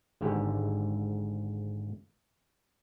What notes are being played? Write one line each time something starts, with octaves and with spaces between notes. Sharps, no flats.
G#1 G#2 D3 G4